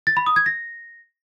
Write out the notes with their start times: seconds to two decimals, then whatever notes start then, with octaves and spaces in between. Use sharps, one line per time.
0.07 A6
0.17 B5
0.26 D#6
0.36 G#6
0.46 A#6